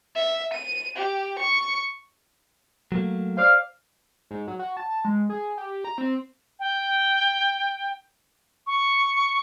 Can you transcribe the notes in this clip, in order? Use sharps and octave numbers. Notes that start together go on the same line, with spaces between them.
E5
D#7
G4
C#6
F#3 A3 A#3
C5 D5 F5
G#2
F#3
F#4
A5
G#3
G#4
G4
A#5
C4
G5
C#6